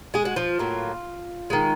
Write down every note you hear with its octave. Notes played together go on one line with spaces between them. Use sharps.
G#3 G#4
F#4
F3 F4
A2 F#3 A#3
D#3 G#3